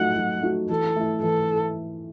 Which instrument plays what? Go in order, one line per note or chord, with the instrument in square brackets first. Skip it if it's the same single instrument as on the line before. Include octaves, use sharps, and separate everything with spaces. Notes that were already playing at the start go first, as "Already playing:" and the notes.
Already playing: [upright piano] F#3 A3 D#4 F#4 [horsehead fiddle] F#5
[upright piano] F#3
A3 D#4 F#4
[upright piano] E3 [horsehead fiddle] A4
[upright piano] A3 E4
[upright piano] E3 [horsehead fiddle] A4